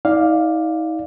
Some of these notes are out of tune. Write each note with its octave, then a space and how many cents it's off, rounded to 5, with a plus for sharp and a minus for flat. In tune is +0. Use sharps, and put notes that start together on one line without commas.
D#4 +40 D5 +0 F5 +5